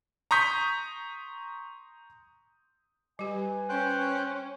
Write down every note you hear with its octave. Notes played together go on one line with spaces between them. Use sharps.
A#5 C6 C#6 D#6 G6 B6
G3 G4 B4 G#5
C#4 C5 G5 F#6